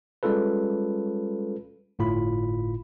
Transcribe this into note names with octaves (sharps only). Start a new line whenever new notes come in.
G3 G#3 C#4 F4 A4 B4
G1 A2 F4 B5